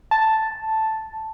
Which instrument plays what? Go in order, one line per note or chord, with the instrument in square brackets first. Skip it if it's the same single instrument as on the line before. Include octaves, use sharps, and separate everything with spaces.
[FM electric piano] A5